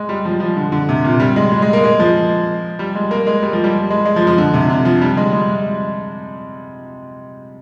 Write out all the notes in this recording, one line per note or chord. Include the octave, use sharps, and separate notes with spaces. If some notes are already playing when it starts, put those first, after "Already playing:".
Already playing: G#3
G3
F3
F3
D3
D3
C3
A#2
G3
G#3
G#3
G#3
A#3
G#3
F3
G3
G#3
A#3
G#3
G3
F3
G3
G#3
G#3
F3
F3
D3
C3
D3
F3
G3
G#3
G#3